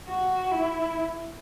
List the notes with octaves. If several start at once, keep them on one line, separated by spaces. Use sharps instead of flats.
F#4
E4